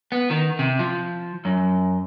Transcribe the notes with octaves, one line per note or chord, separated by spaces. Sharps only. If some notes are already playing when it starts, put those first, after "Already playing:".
B3
D#3
C3
F3
F#2